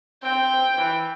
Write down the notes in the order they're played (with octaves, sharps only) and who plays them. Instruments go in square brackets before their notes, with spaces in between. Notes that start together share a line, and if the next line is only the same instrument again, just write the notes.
[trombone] C4 [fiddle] G5
[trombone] E3